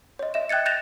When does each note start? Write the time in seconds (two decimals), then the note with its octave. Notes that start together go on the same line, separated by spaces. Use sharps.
0.19 C#5 D#5
0.34 D#5 E5 E7
0.49 G5 F#6 G#6 A6 C#7
0.66 F#6 G6 A6 A#6 E7 F7